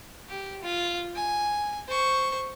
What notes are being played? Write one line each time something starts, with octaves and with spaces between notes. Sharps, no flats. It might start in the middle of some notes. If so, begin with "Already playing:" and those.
G4
F4
G#5
C5 C#6